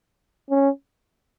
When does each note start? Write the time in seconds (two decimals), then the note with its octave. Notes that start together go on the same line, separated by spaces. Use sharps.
0.51 C#4